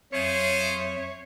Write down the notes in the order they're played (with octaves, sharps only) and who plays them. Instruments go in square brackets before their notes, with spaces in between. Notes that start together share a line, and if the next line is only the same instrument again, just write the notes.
[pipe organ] F2 F#3 E5 [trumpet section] F4 G#4 C5 [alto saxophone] C#5